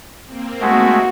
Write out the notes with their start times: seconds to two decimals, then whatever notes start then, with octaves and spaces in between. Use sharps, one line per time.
0.25 A#3 C4
0.61 G#3 A3 F#4